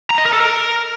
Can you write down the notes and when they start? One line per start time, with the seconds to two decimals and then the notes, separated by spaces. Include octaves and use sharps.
0.10 A#5
0.18 D#5
0.25 A#4
0.33 A4
0.40 A#4